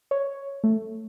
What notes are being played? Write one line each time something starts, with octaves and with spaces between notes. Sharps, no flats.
C#5
A3